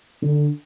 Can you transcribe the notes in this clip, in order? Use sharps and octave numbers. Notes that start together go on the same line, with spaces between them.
D3